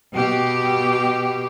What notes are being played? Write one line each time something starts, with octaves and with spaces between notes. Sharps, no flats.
B2 G4